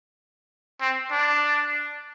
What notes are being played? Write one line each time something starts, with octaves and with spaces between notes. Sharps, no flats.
C4
D4